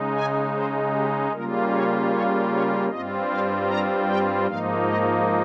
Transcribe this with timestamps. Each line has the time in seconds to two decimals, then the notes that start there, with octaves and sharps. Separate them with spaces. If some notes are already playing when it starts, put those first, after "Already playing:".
Already playing: C#3 G#3 D#4
0.14 G#5
0.54 C5
0.93 G4
1.32 C#3 G3 A#3 F4 A#4
1.72 C#5
2.11 C#5
2.51 C#5
2.89 G2 G3 C4 F4 D#5
3.28 F5
3.67 A#5
4.07 G5
4.47 G#2 F3 A#3 D#4 F5
4.86 D#5